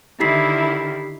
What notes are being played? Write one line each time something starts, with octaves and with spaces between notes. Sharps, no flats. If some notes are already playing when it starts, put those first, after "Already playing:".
D3 D#3 E4 G4 B6 C7